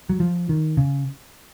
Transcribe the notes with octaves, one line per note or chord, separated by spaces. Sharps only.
F#3
F3
D#3
C#3